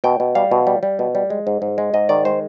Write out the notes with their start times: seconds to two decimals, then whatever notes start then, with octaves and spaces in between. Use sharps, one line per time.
0.04 B2 G5
0.20 B2
0.35 G3 F5
0.51 B2
0.67 G3
0.83 G3
0.99 B2
1.15 G3
1.30 G#3
1.47 G#2
1.62 G#2
1.78 G#3
1.94 G#2 D#5
2.09 D#3 D5
2.25 G#3 C5